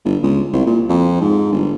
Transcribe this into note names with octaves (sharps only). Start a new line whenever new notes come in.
G1
C#2
C2
A#2
F2
G#2
G1